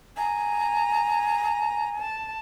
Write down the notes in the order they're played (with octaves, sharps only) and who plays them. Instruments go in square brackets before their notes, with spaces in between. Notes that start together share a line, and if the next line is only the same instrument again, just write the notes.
[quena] G#5 [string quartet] A#5
[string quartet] A5